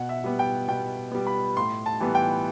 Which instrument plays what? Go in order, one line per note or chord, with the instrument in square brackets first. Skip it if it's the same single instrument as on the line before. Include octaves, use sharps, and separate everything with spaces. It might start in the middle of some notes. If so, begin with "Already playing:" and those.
Already playing: [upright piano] B2 [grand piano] F#5
[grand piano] E5
[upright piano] G3 B3
[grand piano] G5
[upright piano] B2 [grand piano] G5
[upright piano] G3 B3
[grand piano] B5
[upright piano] A2 [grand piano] C6
[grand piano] A5
[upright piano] E3 G3 B3
[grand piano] G5